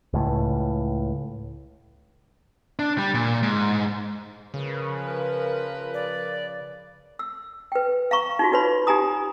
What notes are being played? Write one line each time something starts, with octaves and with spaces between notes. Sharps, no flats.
C#2 A2
D4
G3
A#2
G#2
C#3 F3 A#4 B4
D5
E6
B4 G5
F5 A#5 C#6
D#4 F4 F#4
D#4 F#4 B4 C#5 B5
D#4 G4 G#5 A#5 D#6